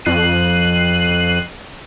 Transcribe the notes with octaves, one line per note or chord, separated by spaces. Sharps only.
F2 F#6 C7 D#7